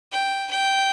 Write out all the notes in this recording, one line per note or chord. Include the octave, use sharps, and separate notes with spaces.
G5
G5